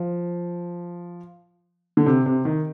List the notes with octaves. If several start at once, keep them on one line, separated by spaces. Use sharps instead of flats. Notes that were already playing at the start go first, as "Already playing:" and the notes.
Already playing: F3
D3
C3
C3
D#3